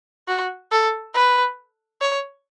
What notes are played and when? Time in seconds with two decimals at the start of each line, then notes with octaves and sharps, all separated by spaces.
0.28 F#4
0.72 A4
1.14 B4
2.01 C#5